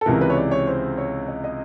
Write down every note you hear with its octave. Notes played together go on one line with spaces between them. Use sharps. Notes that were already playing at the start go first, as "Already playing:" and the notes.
A4
C#2 C3 E3 A#4
B4
C#5
D5
C#5
C5
C#5
D#5
D#5